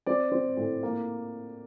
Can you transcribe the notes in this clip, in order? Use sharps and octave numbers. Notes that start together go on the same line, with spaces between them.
C4 D5
C4
A2
A#3